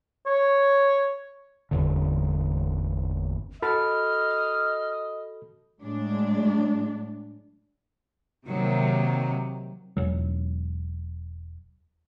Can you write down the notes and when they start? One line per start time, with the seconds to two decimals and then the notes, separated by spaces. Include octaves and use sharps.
0.26 C#5
1.71 G1 E2 D3
3.62 F#4 A4 D#5 B5 F6
5.81 A2 F#3 G#3 D4
8.48 C3 D#3 F#3 A#3
9.97 E1 F#3